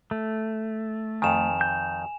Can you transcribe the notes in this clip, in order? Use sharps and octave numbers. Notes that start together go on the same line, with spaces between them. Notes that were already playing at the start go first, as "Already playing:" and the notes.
A3
F2 D#3 G#5 E7 F7
G6